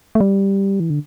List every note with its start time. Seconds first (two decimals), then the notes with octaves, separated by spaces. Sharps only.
0.15 A3
0.20 G3
0.80 E3
0.90 D3